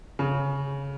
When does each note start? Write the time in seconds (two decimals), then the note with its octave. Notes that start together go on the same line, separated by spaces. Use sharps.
0.19 C#3